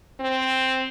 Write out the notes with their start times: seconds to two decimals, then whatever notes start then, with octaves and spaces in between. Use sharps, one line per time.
0.20 C4